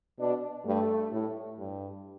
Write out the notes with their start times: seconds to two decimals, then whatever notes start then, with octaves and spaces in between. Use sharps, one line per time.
0.19 B2 D4
0.66 G2 A3
1.12 A2
1.59 G2